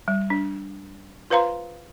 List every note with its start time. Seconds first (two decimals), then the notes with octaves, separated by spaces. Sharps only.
0.08 G3
0.30 D4
1.30 F4 B4 C5 F5 A#5 C6